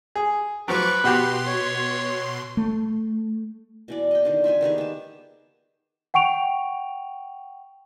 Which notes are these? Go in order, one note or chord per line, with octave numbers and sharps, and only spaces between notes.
G#4
F3 F#3 B4 C#6 D6
B2 B3 F#4 G4 C6
C#5
A3
B2 E3 D5
D#5 G5
D3 D#3 D4
F3 E5 G5 G#5
D#3 B3 G4 G#4
B3 A5
F#5 G5 C#6 D7 F7